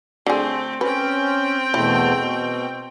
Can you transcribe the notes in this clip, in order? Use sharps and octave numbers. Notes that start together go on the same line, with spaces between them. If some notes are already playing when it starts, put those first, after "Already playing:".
D3 A3 C4 G#4
C4 C#4 B4 G5
E2 B2 A3 E4
B2